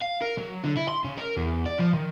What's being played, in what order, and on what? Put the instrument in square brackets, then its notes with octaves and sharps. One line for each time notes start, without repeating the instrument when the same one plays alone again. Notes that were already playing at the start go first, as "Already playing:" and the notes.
[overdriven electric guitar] F5
A#4
F#3
D3
E4
C6
C#3
A#4
E2
D5
F3
D#3